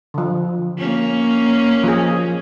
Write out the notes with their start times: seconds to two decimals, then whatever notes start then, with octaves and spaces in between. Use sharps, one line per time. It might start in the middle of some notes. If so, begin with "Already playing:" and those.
0.14 D3 F3
0.78 A#3 C#4
1.84 F3 G#4